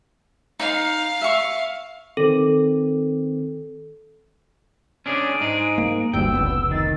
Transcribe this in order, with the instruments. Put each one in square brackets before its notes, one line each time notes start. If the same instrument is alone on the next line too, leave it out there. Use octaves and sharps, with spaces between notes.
[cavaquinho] D#4 [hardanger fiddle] F5
[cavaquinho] E5 C#6
[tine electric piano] D#3 C4 [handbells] A4
[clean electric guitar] C#4 D4 G#4 [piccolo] D7
[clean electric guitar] G#2 D#4 G#4
[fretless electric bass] A#3
[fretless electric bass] F#1 D2 G2 [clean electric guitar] G5 [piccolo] E6
[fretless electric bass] F1 C#2 B3
[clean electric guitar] D#3 [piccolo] A6